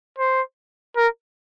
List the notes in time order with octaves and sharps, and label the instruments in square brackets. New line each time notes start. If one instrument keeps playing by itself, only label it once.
[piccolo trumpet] C5
A#4